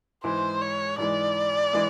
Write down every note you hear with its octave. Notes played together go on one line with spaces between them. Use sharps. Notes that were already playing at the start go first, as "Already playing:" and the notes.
G#2 E3 G#3 C5
C#5
G#2 E3 G#3 D5
E3 G#3